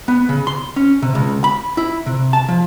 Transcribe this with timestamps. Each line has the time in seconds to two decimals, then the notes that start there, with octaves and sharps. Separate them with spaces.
0.08 B3
0.29 C#3
0.47 C6
0.76 C#4
1.02 C3
1.15 C#2
1.44 B5
1.77 E4
2.06 C3
2.33 A5
2.49 F3